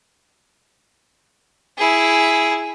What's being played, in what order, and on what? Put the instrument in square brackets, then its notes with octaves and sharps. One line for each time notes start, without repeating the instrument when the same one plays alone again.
[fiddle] E4 G#4